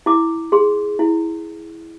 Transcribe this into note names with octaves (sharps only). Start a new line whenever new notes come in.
E4 D6
G#4 C6
E4